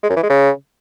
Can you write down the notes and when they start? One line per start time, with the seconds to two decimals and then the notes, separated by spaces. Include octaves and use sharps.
0.03 G#3
0.10 F#2
0.16 E3
0.23 G#3
0.30 C#3